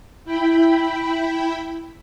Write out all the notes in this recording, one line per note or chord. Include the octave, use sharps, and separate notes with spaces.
E4 G5 B5